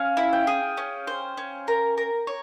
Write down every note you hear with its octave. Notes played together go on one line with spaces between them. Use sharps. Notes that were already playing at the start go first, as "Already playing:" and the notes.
Already playing: C#4 F5
E4
G5
G#4
C#4
C5
C#4
A#4
A#4
C#5